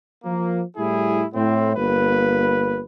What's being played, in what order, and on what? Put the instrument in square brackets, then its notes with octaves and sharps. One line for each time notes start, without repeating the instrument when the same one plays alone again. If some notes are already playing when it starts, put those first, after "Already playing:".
[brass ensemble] F3 A#3
A2 G3 E4 G#4
A2 C4
G1 A#3 B4